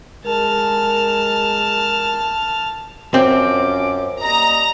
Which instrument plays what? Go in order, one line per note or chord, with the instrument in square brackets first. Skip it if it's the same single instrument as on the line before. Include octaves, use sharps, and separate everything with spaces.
[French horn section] G#3 A#4 [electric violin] A5 F6
[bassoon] F#2 [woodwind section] F3 C#4 D6 [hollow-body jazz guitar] C4
[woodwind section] G3 A#3 D#5 [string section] A#5